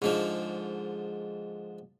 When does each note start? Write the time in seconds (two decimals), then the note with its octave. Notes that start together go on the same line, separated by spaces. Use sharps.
0.02 G#2 D3 F3